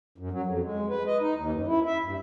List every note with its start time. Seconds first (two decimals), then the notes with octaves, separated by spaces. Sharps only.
0.18 F#2
0.32 F#3
0.46 F2
0.63 G#3
0.89 B4
1.07 D#5
1.20 D#4
1.36 D#2
1.53 F#2
1.67 E4
1.86 E5
2.04 G2